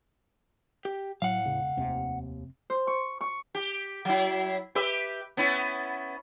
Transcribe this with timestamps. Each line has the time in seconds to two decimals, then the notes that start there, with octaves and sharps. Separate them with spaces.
0.85 G4
1.22 A2 F#3 F5 F#5
1.45 E1 C#3
1.77 F1 D#2 C3 C4
2.70 C5
2.87 C#6
3.21 C#6
3.55 G4
4.05 F#3 E4
4.75 G4 B4 E5
5.37 B3 C#4 E4